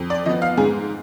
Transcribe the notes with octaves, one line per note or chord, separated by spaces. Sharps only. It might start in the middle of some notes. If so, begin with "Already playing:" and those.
Already playing: F2
D5
F3 B3 D#5
F5
G#2 G#4